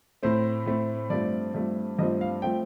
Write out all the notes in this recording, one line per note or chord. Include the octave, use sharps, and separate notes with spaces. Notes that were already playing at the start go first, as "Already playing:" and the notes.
A2 A3 C4 C5
A2 A3 C4
G2 F3 A3 C4 D5
G2 F3 A3 C4
G2 F3 A3 C4 D#5
F5
F3 A3 C4 G5